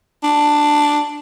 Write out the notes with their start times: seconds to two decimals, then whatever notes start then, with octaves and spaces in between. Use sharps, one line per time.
0.23 D4